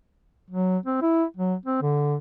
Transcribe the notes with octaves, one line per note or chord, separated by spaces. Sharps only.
F#3
C4
E4
F#3
C4
D3